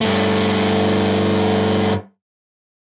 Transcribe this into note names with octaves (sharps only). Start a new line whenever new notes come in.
G2 A3